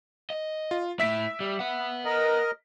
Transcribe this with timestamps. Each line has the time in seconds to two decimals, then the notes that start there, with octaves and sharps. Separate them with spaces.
0.30 D#5
0.71 F4
1.00 A3 E4 E5 B6 D7
1.40 G3
1.59 B4 F#5
2.05 A#4 D#5